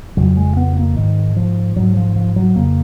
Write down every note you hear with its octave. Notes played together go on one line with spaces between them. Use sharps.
F2 C#3 F#3
G#3
B3
A#3
G#2 D#3
F3
G#2 F#3
F3
F3
F#3
F2 C#3 A#3